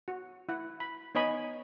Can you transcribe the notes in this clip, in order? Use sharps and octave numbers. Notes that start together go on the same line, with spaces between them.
F#4
E4 F#5
B5
B3 D#4 C#5 D#5 G#5 B5